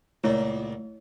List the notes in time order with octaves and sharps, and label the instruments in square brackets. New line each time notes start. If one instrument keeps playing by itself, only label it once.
[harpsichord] C#2 A#2 [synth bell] A3 [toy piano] E4 C#5 D#5